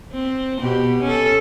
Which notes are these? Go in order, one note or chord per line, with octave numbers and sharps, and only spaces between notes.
C4
B2 G4
C#4 A4